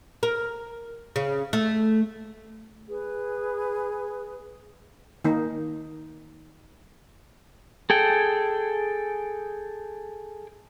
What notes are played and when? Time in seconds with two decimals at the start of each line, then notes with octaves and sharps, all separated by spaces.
0.23 A#4
1.16 C#3
1.53 A3
2.88 G#4 B4
5.24 D#3 A#3 D#4
7.90 G#4 A4 G5